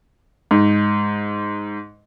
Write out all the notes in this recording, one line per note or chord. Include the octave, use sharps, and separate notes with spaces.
G#2